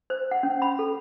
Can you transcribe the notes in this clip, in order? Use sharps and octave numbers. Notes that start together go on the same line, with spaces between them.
C5
F#5
C#4
B5
A4